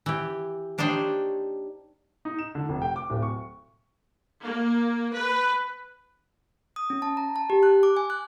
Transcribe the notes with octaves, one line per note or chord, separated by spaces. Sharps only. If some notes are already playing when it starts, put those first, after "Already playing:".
E3 G4
A#3 D4 D#4 G4 C5 C#5
D#4
E7
D3
F1
G5
D6
D1
C#6
A#3
B4
D#6
C#4
A5
A#5
A5
G4
F#6
D6
G#5
F#6